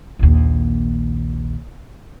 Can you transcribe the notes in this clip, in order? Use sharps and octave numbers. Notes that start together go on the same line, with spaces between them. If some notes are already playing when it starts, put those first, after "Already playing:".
A#1 D#2